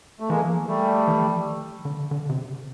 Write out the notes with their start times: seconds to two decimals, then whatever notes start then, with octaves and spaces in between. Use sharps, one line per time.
0.20 A3
0.29 E3 G#3 A#3
0.40 F3
0.51 E3
0.68 G3 A3
1.08 E3
1.22 F3
1.34 E3
1.46 D#3
1.85 D3
2.11 D3
2.29 C3
2.37 C#3